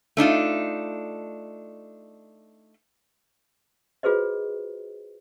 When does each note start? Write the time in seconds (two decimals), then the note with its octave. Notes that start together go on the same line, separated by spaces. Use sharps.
0.17 A3 D4 D#4 F4
4.03 F4 F#4 G#4 B4 C5 D#5